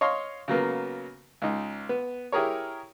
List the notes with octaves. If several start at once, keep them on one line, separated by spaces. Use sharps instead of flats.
C#5 D#5 F5 C6 C#6
C#3 F#3 A#3 B3
C#2 D#4
B3
E4 G4 G#4 A#4 C#5